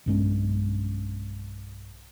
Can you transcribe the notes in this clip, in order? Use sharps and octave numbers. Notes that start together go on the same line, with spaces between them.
B1 G2 G#3 C#4